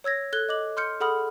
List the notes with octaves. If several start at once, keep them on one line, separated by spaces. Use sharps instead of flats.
C#5 E6 G#6 A#6
A4 F#6 G#6 G7
D#5 D6 F#7
C6 F6 G6 C#7
G#4 A4 F#5 B5 D#6 F6